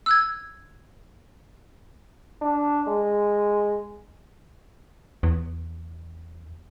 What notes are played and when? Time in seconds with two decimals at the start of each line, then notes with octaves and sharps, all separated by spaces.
0.06 E6 F#6 G#6
2.42 D4
2.87 G#3
5.23 E2